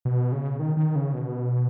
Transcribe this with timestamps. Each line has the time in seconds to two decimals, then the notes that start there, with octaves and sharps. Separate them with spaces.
0.05 B2
0.32 C#3
0.59 D#3
0.77 D#3
0.95 C#3
1.13 B2